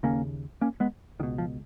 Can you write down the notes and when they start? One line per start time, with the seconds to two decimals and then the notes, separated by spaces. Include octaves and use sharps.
0.03 D#2 C#3 A#3 C#4
0.61 A#3 C#4
0.80 G#3 B3
1.19 C#2 D#3
1.23 B2
1.38 F3